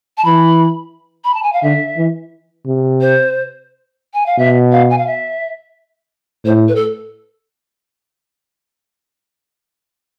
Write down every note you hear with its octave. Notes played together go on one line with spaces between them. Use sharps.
A5
E3 B5
B5
A5
G#5
F5
D3 E5
E3
C3
C5
G#5
F5
B2 E5
F5
G#5
F5
E5
A2 C5
B4
A4